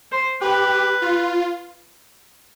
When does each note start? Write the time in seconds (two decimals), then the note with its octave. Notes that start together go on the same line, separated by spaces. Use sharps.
0.12 C5
0.41 G4 B4
1.02 F4